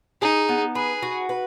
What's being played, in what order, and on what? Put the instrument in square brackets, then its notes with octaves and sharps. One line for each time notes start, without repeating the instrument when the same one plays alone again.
[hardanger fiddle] D#4 [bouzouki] G#4
[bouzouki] B3
[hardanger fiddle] G#4 [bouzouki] B4
[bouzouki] F#4
B4